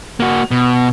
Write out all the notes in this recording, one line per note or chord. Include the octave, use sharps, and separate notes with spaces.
A#3 F#4
B2